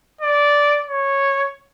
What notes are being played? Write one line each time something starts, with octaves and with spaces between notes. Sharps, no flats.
D5
C#5